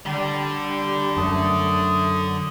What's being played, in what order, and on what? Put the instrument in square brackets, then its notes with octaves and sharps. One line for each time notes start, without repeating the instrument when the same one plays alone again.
[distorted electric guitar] D3 [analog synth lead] G3
[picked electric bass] F#2 [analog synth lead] A3 [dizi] D#6